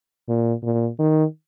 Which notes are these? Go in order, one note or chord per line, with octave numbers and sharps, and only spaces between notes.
A#2
A#2
D#3